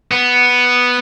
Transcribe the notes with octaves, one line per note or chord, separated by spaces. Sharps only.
B3